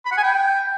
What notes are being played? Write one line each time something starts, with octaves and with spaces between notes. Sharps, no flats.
B5
F#5
G#5
G5